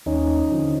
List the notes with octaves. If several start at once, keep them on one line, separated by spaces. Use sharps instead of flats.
D#2 C#4 D#4
D3 F3